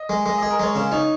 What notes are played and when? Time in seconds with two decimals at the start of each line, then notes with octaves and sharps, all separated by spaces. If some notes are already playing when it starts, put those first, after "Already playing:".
Already playing: D#5
0.09 G#3
0.26 G#3 D#5
0.38 D#5
0.43 G#4
0.51 A#4
0.60 G#3 C#5
0.75 C#3
0.92 D#4 C#5